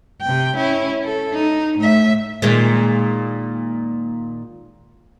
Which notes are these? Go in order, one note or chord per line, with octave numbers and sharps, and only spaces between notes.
C3 G5
C#4 E4
A4
D#4
A2 E5
A#2 D#3 G#3